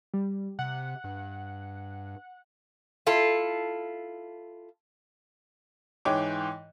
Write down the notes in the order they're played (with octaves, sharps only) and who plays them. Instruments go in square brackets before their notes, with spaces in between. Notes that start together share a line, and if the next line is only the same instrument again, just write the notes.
[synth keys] G3
[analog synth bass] C3 [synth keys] F#5
[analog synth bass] G2
[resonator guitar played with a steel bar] E4 F4 A4
[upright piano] G#2 E3 C#5 G5 D6